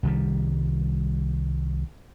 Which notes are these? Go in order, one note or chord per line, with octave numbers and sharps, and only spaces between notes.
C2 D#3 G3